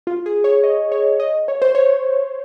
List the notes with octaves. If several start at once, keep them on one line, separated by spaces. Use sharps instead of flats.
F4
G#4
C#5
D#5
C#5
D#5
C#5
C5
C#5